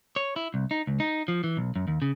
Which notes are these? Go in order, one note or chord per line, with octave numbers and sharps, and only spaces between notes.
C#5
E4
C2
D#4
C#2
D#4
F3
E3
B1
F#2
D#2
C#3